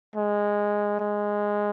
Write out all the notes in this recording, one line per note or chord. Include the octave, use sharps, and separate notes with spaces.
G#3
G#3